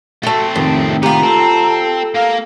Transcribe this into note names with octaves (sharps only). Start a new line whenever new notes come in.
A3 C4 F#4 A4
F2 A2 C3 D#3
B3 F4 G4 A#5
C4 A4
A#3 A#4 F5